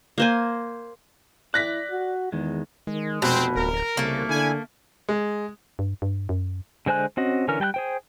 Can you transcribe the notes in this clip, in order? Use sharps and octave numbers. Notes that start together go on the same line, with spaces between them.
A#3 C5 G#5
E4 D5 F#6 A#6 B6
F#4
E2 D#3 G#3
D#3 G#3
F1 B2 C4
D1 A#4
C2 C#3 A3 A#3
D3 E4 G#5
G#3
G2
G2
F#2
D3 G#3 C5 G#5 F#6
C4 C#4 F#4 D#5
D3 E3 C#4 A#4 F6
G3 G5 A5 F#6
G#4 C5 G5